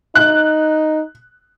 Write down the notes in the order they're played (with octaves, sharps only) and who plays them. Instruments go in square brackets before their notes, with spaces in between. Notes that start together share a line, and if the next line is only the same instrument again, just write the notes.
[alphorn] D#4 [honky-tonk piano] F#6